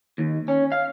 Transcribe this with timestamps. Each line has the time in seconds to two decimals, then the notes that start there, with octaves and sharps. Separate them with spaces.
0.18 D#2
0.48 C#4
0.72 F5